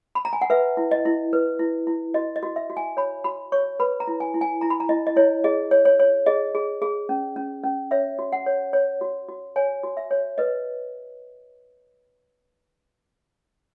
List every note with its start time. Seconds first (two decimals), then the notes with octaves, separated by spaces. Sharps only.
0.15 B5
0.25 A#5
0.33 G#5
0.41 F#5
0.50 B4 E5
0.77 E4
0.91 D#5
1.06 E4
1.33 B4
1.59 E4
1.87 E4
2.14 F#4 D#5
2.36 D#5
2.43 F#4
2.56 E5
2.70 F#4
2.77 G#5
2.97 C#5 B5
3.24 F#4 B5
3.52 C#5 C#6
3.80 B4 B5
4.00 A#5
4.07 E4
4.20 G#5
4.34 E4
4.41 G#5
4.61 E4 A#5
4.70 B5
4.80 A#5
4.89 E4 D#5
5.07 D#5
5.16 E4 C#5
5.44 G#4 D#5
5.71 C#5
5.85 C#5
6.00 C#5
6.26 G#4 D#5
6.55 G#4
6.82 G#4
7.09 C#4
7.36 C#4
7.63 C#4
7.91 C#5 E5
8.19 F#4
8.32 F#5
8.46 C#5
8.73 C#5
9.01 F#4
9.29 F#4
9.56 C#5 G#5
9.83 F#4
9.97 E5
10.11 C#5
10.38 B4 D#5